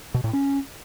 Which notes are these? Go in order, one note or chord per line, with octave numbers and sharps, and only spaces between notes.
B2
A2
C#4